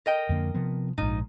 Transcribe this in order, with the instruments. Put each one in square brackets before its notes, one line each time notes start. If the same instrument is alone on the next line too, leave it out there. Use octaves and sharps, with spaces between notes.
[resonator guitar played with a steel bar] A#4 D#5 G5
[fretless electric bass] F2 D3 A#3
C3 F3 B3
[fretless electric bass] A#1 G#2 [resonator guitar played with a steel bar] D#4 F4